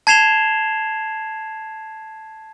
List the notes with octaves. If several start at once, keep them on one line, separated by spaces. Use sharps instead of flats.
A5 G#6 C7 E7 F7 G7